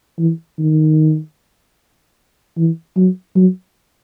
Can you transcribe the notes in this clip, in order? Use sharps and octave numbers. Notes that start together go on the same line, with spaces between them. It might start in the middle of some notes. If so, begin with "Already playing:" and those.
E3
D#3
E3
F#3
F#3